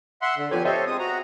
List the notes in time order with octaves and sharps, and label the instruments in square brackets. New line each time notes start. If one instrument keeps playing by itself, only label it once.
[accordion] E5 F#5 C6
D3
[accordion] D3 G4 G#5 [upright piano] F3 B3 C#5
[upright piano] G4 D#5 E5 [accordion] A4 C5 C#5
[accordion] G#3 C4 D#6
F#4 A#5